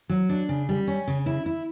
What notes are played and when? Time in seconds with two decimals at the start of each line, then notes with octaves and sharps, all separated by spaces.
0.09 F#3
0.29 D4
0.49 C#3
0.69 G3
0.88 C#4
1.08 C#3
1.26 E4
1.46 E4